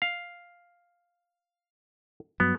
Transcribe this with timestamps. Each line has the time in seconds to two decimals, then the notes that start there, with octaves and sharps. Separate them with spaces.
0.02 F5
2.40 G2 F#3 B3